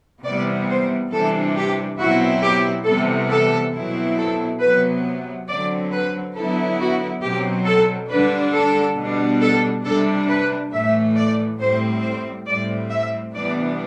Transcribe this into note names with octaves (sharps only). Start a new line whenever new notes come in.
C3 E3 G3 B3 D5
C5
C3 E3 G3 D4 A4
G4
B2 F#3 C4 E4 F#4
G4
C3 E3 G3 B3 A4
A4
B2 F#3 C4 E4
A4
C3 F#3 B3 B4
D3 F#3 C4 D5
B4
D3 F#3 B3 E4 A4
F#4
B2 F#3 C4 G4
A4
D3 G3 D4 B4
A4
B2 G3 D4
A4
C3 G3 D4 A4
B4
A2 E3 A3 E5
D5
A2 G3 C4 C5
C5
A2 G3 C4 D5
E5
C3 E3 G3 B3 D4 D5